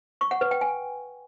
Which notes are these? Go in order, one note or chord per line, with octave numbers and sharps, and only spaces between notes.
C#6
F#5
B4
G5
G#5